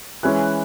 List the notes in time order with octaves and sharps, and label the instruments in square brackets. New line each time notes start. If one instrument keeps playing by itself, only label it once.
[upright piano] E3 G#3 C#4 E4 F#6